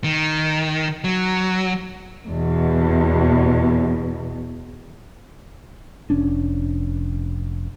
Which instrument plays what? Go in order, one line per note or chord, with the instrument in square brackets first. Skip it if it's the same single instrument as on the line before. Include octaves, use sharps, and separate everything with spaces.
[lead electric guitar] D#3
F#3
[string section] E2 B2
[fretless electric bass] F1 C#4 D4